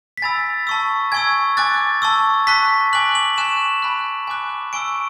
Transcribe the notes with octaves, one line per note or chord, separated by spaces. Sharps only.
B6
G#5 B5 E6 A6
A5 C#6 E6
G#5 C#6 E6 G#6
G#5 D6 F#6 A6
A5 C#6 E6
A5 C#6 F#6 B6
G#5 D6 F#6 F#7
F#7
G#5 C#6 F#6 E7
G#5 B5 F#6
G#5 D6 F#6
G#5 C#6 E6 D7